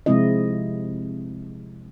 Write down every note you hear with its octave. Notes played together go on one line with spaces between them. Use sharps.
C3 F3 G#3 C4 E4 D#5